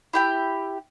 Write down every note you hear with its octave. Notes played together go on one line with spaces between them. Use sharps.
E4 G4 G5